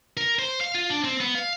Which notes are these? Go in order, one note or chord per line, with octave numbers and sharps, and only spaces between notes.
A#4
C5
F5
F4
D4
C4
B3
F5